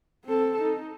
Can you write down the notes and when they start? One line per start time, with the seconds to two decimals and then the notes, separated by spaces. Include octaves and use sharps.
0.25 C4 A4
0.62 D#4